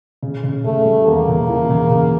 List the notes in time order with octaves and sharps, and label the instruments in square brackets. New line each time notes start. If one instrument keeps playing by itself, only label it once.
[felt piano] C#3
C#3
[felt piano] C#3 [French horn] A3
[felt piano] G3
[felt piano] E2 [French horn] A#3
[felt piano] C#3
E3
C#3
C#3